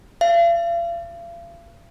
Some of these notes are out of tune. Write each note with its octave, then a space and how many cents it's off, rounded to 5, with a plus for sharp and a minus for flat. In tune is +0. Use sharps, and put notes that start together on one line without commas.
F5 -40